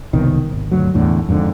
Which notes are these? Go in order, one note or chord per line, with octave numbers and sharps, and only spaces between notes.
F#1 C2 B2 D#3
G#1
G1 D2 F#3
E2 A2 D3
F2 G#2 B2 D3